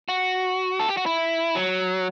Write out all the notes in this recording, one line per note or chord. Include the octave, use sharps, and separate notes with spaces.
F#4
A4
G4
F#4
E4
F#3